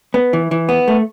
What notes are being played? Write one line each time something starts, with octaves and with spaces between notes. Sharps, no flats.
B3
E3
E3
B3
A3